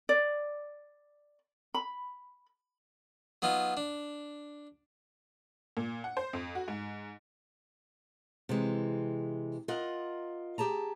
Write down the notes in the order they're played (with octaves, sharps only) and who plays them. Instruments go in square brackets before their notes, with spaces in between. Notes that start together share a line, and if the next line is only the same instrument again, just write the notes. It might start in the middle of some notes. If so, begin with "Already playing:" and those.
[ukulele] D5
B5
[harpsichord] F#3 B3 D#4 F4
D4
[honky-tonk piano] A#2
F#5
C5
F2
F#4
G#2
[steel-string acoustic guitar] C3 E3 G#3
F4 A#4 D#5 F#5
G4 G#4 A5 A#5